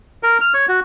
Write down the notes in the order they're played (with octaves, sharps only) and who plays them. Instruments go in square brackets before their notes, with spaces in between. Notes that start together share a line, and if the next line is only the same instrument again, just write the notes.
[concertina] A#4
F6
C#5
F#4